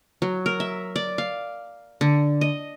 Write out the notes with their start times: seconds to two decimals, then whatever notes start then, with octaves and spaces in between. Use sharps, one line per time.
0.22 F#3
0.46 A#4
0.60 E5
0.96 D5
1.18 F5
2.01 D3
2.41 D#5